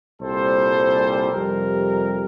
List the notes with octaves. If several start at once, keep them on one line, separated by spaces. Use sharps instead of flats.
C2 A#2 G3 A4 C5
F2 C3 G3 G4 A#4